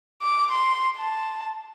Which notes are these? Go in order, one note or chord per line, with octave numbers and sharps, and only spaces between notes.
D6
C6
A5